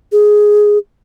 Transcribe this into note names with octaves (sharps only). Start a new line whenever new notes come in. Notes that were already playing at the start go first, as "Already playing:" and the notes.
G#4